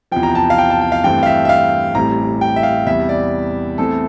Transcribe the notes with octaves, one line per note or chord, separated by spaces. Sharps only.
E2 C3 F3 G5
A#5
A5
F5
G5
A5
G5
F5
G2 E3 A3 C4 G5
F5
E5
E5
F5
A1 A2 G3 C4 A#5
G5
E5
F5
E2 C3 G3 E5
D5
E2 E3 A3 C4 A4